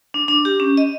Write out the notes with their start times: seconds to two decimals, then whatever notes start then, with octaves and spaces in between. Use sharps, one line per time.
0.14 D4
0.28 D4
0.45 G4
0.60 C#4
0.77 D#5